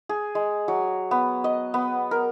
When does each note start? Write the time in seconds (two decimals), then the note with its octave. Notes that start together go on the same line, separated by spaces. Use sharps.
0.09 G#4
0.35 G#3
0.68 F#3
1.11 B3
1.44 D#5
1.74 B3
2.11 A#4